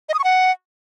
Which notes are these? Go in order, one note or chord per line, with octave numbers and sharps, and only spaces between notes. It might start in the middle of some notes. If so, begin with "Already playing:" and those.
D#5
D#6
C#6
F#5